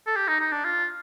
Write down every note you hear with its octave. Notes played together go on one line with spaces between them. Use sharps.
A4
G4
D#4
D#4
D4
F4